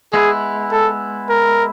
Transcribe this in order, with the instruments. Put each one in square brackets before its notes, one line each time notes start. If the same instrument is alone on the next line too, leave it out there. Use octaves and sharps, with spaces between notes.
[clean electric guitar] G#3 B3 E4 [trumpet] G#4
[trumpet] A4
A#4